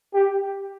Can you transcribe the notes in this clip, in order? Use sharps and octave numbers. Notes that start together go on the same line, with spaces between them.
G4